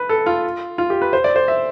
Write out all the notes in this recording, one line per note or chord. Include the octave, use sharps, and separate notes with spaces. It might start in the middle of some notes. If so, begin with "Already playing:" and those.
Already playing: B4
A4
F4
F4
G4
B4
C5
D5
C5
E5